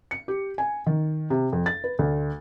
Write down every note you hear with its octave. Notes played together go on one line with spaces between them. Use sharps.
C#7
G4
G#5
D#3
C3
F2
A6
B4
D2